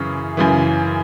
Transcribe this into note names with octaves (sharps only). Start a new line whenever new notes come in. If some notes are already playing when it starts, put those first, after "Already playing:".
Already playing: F#2 C#3 E3 C#6
F#2 C#3 E3